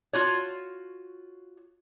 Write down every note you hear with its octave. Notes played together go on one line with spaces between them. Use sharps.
F4 F#4 C#5